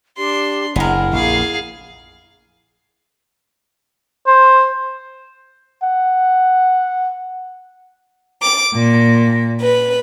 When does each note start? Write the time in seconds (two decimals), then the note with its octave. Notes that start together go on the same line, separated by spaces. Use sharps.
0.18 D4 G4 C6
0.76 F#1 G#3 B3 E4 A#4
1.13 A#1 F2 G#4 F5
4.27 C5
5.83 F#5
8.42 D6
8.74 A#2
9.61 B4